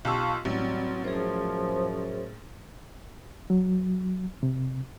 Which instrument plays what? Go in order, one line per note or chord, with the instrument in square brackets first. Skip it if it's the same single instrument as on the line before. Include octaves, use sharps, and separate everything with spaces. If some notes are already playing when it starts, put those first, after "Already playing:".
[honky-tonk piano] B1 G4 E6 [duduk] F4 [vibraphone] F5 A5 C#6
[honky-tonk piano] A1 [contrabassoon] F#3 [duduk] G3 [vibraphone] C4
[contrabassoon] F#2 [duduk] F3 [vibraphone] G#4 C5
[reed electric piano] F#3
C3